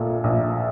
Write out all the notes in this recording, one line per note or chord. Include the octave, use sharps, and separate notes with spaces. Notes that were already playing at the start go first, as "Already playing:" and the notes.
Already playing: A#1 A#2 F4 A4
A#1